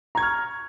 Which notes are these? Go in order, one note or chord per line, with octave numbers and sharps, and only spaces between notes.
A#5 C#6 F6 G#6